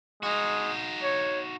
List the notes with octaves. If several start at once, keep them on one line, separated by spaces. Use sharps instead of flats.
G#3 D#4 F#4
C#5